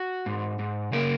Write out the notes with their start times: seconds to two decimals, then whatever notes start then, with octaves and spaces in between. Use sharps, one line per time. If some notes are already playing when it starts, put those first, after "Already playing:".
Already playing: F#4
0.26 G#2
0.59 G#2
0.92 C#3 A#3 A#4